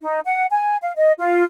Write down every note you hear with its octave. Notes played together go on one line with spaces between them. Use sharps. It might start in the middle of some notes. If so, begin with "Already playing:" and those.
D#4
F#5
G#5
F5
D#5
F4